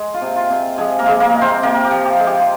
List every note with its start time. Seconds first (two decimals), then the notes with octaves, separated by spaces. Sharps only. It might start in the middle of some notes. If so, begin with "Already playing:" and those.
Already playing: G#3
0.14 F4
0.21 C3
0.36 F4
0.50 C3
0.78 F3 G#3 G#4
0.99 A#3 A#4
1.06 G#3
1.20 A#3 A#4
1.35 C3
1.41 C4 C5
1.63 C3 A#3 A#4
1.84 G4
1.91 F3
2.05 G4
2.19 G#3
2.27 G4
2.40 F4